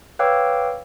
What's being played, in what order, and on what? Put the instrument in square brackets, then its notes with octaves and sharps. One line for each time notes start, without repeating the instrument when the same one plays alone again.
[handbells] B4 C#5 F5 G5 D6 E6